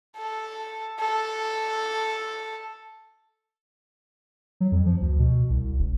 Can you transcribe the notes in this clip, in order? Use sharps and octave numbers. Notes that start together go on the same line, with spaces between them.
A4
A4
F#3
F2
F3
D2
B2
C2
E1